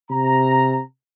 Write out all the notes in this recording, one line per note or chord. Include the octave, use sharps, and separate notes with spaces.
C3 A#5